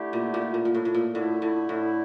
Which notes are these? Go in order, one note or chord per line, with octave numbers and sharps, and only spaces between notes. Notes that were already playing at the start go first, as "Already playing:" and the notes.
Already playing: D3 A3 E4 G4
A#2
A#2
A#2
A#2
A2
A2
A#2
A2 D3 A3 E4
A2
A2